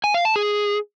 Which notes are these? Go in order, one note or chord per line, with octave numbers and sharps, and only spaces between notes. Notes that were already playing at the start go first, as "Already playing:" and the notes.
G#5
F5
A5
G#4